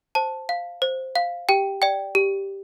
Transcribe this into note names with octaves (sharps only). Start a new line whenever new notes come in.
C5 A5
F5
C5
F5
G4 G5
D5 G5
G4